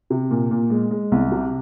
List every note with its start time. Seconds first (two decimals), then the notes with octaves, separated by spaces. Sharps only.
0.10 C3
0.31 A#2
0.51 A#2
0.70 G#3
0.91 G#3
1.12 C2
1.32 C3